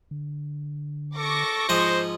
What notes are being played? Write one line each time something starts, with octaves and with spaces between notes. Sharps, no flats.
D3
A4 C#6 D6 A#6
G#2 F3 C5 D#5